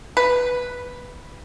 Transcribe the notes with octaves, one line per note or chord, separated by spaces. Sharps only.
B4